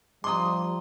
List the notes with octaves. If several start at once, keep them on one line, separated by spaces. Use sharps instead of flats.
F3 G3 A#5 C6 D6 D#6